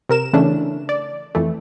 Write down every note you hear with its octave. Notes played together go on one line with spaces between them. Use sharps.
C3 A#4 E7
C#3 E3 A3 C#4 D4
D5
F2 E3 A3